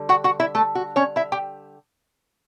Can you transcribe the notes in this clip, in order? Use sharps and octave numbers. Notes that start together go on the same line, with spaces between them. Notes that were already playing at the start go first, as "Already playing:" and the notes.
Already playing: D3 G3
F#4 F#5
F#4 F#5
E4 E5
A3 A4
F#4
C#4 C#5
E4 E5
G4 G5